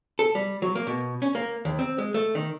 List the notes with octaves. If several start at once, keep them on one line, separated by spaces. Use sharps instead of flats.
A4
G3
F#3
A#3
B2
C#4
A#3
D#2
C4
G#3
A3
D#3